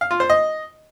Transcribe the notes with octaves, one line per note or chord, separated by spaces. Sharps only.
F5
F4
C5
D#5